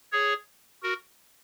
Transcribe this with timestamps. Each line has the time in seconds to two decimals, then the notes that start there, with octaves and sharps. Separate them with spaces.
0.12 G#4 C#5
0.83 F#4 A#4